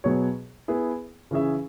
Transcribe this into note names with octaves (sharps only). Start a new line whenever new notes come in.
B2 F#3 B3 G#4 C#5
B3 E4 G#4
C#3 E3 C#4 G#4 E5